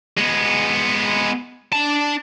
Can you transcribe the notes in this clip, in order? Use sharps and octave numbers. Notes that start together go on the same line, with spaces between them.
G#3 B3
D4 A5